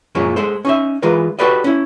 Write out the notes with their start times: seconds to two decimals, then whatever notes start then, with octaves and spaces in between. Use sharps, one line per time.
0.15 F#2 A#2 F3 G#3 A#3 C#4
0.36 G#3 A4 C5
0.65 C#4 D#4 E5
1.02 E3 G#3 F4 A#4 B4
1.39 F#4 G4 A4 B4 D5 D#5
1.64 C#4 E4